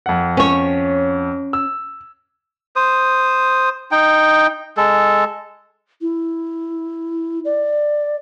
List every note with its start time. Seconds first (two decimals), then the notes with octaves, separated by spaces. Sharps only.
0.06 F2 F#5
0.37 C#4 C#5
1.53 E6
2.76 C5 D#6
3.91 D#4 G5
4.77 G#3 A4
6.02 E4
7.45 D5